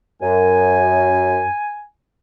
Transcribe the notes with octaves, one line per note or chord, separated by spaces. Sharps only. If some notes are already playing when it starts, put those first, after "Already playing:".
F#2 G#5